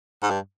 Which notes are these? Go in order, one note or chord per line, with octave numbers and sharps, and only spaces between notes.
G#2
G2